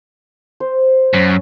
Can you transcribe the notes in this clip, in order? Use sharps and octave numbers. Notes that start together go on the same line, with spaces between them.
C5
F#2 C#4